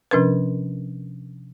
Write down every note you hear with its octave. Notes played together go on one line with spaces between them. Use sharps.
C3 F3 C#4 D4 A#4 B4